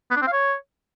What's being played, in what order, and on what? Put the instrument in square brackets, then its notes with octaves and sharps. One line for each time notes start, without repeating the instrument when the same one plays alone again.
[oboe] B3
D4
C4
F5
C#5